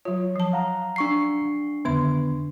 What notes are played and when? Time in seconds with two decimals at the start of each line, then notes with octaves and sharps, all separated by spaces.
0.05 F#3 F4 C#5
0.36 F3 A5
0.53 F5 F#5 A#5
0.96 D4 C#6 C7
1.85 F2 D3 D#3 B3 E5 B5